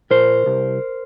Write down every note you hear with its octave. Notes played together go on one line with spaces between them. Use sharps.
A#2 A#4 C5
C2